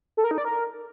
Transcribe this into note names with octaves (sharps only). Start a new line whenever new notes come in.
A4
A#4
D#4
D5
A#4